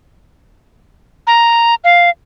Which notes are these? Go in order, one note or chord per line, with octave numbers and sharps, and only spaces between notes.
A#5
F5